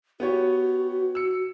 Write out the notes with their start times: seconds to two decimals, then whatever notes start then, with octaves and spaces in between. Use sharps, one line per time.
0.20 B3 F#4 G4 C#5
1.15 E6 C#7